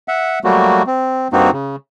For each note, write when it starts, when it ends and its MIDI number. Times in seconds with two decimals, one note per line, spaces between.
0.08 0.39 76
0.08 0.39 78
0.44 0.82 54
0.44 0.82 55
0.44 0.82 57
0.44 0.82 58
0.44 0.82 66
0.87 1.28 60
1.33 1.51 43
1.33 1.51 58
1.33 1.51 60
1.33 1.51 63
1.33 1.51 66
1.52 1.76 49